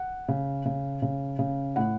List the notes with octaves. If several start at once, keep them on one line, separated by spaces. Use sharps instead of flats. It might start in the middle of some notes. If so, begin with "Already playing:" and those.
Already playing: F#5
C#3
C#3
C#3
C#3
A2 F#5